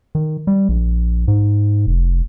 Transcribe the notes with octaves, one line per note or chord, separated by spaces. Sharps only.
D#3
G3
A#1
G#2
F1